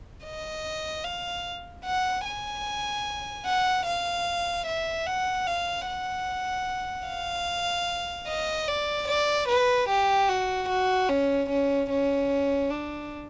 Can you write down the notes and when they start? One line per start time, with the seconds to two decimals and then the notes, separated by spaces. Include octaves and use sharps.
0.24 D#5
1.04 F5
1.85 F#5
2.26 G#5
3.46 F#5
3.86 F5
4.67 E5
5.07 F#5
5.47 F5
5.87 F#5
7.07 F5
8.28 D#5
8.68 D5
9.08 D5
9.49 B4
9.89 G4
10.29 F#4
10.69 F#4
11.09 C#4
11.49 C#4
11.90 C#4
12.70 D4